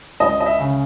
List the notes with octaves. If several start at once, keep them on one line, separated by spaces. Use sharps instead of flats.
C#2 D#5
D#5
E5
C#3